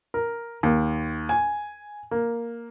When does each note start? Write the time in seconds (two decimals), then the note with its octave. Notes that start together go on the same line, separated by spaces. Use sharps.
0.14 A#4
0.63 D#2
1.29 G#5
2.11 A#3